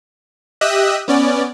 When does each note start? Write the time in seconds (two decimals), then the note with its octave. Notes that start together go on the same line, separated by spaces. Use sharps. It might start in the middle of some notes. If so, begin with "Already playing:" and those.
0.61 G4 D#5 E5 D#6 E6 F#6
1.08 B3 C#4 D5